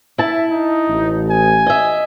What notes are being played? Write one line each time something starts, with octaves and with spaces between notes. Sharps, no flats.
E4 E5 A5
D#4
A1
G#5
D#5 E5